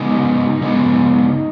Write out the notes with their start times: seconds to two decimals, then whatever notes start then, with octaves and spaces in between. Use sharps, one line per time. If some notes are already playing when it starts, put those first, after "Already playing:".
Already playing: C#3 G#3 B3 D#4
0.61 C#3 G#3 B3